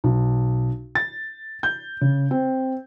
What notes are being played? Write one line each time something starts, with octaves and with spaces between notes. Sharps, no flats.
B1
A6
G6
C#3
C4